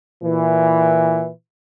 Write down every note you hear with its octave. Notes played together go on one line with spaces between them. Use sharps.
A#2 E3